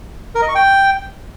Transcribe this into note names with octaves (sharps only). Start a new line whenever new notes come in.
A#4
D#5
C#6
G5